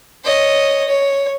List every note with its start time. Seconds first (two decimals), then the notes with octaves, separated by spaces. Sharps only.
0.24 C#5 D#5
0.88 C#5